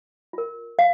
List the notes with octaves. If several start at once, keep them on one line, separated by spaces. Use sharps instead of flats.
F4 A#4
F5